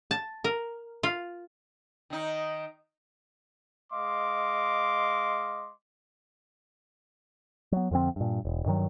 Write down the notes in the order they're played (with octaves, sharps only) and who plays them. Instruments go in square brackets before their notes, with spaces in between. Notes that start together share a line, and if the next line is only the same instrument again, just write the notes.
[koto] A5
A#4
F4
[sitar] D#3 D#4
[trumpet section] G#3 D#5 F5 C6 D6
[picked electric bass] F#3 B3
F2 D3 F3 C4
G2 A#2
E1
G2 D#3 F#3